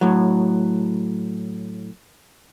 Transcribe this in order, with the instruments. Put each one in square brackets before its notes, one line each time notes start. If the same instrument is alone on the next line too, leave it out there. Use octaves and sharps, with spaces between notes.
[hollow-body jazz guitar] A2 F#3